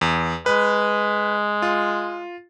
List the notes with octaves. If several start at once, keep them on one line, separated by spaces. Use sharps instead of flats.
E2
G#3 B4
F4